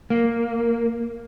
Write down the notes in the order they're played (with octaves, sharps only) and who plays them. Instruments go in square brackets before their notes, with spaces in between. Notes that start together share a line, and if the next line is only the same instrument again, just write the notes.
[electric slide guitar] A#3